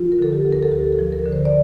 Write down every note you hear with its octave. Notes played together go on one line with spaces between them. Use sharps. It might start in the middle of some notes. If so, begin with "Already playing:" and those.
Already playing: F3 F4
A#4
D3 A4
G4
D2
A#4
A4
D2 G4
A4
F3
A#4
D3
C5
D5